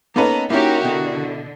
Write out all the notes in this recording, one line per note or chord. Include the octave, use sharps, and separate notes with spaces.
A#3 B3 C#4 D#4 A4 B4 A#5
A#3 C#4 D#4 E4 F#4 G4 A#4
B2 D3